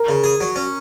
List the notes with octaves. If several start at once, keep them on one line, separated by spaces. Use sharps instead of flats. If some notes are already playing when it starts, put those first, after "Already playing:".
Already playing: A#4
C#3
G#4
F#3
C#4